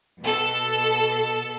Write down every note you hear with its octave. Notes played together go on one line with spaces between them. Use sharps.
B2 A4